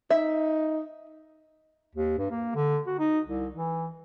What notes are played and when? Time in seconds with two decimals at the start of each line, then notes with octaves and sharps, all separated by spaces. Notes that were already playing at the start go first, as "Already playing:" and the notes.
0.10 D#4 E5
1.95 D#2
2.18 G2
2.31 A#3
2.55 D3
2.87 F#4
2.99 D#4
3.27 C2
3.54 E3